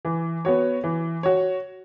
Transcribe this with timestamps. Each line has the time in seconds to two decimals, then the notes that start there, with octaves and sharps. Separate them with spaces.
0.05 E3
0.45 B3 F#4 C#5
0.84 E3
1.23 F#4 C#5